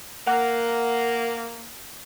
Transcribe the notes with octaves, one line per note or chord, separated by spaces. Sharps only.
A#3 F#5